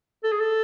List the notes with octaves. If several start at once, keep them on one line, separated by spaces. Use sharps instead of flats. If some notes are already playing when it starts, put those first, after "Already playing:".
A4
G#4
A4